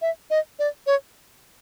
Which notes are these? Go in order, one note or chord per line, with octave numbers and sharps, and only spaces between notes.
E5
D#5
D5
C#5